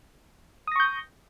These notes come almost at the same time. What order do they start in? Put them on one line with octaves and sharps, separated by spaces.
D#6 A#6 C#6 G6